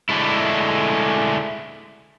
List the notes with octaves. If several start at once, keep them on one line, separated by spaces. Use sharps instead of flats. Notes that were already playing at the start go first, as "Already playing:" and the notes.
D3 G#3 A3 E4